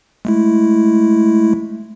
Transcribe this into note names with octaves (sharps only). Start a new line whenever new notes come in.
G#3 A3 E4